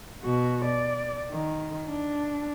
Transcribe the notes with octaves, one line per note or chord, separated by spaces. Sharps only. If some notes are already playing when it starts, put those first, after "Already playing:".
B2 F#4
D5
D#3
D4